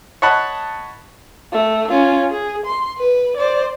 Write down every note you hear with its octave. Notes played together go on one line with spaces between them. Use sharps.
C#5 D#5 F#5 A5 B5
A3
C#4 F4
G#4
C6
B4
C5 D5